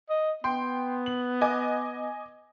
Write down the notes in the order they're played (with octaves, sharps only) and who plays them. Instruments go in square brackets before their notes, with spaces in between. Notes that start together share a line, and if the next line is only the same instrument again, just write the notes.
[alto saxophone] D#5
[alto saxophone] B3 [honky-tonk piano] G5 C6
[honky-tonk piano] F#7
D#5 G#5 D6